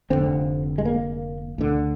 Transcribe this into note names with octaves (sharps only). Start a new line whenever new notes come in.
F1 D#2 D3 C4
G#3
A#3
D2 D3